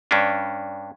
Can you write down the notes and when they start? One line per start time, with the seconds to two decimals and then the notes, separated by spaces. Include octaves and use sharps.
0.11 G2 C#4 D4